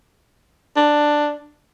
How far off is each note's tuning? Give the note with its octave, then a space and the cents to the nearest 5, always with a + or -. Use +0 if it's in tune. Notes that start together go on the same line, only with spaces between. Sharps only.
D4 +10